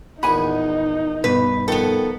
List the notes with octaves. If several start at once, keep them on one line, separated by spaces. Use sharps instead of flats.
A#1 E2 D#4 F#5 G#5 B5
G2 B2 B4
F2 D#3 B3 A4